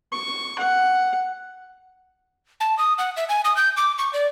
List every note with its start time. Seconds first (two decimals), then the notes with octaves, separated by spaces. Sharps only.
0.12 C#6
0.59 F#5
2.60 A5
2.79 D#6
2.98 F#5
3.17 E5
3.29 G#5
3.45 D#6
3.57 G6
3.77 D6
3.98 C#6
4.13 D5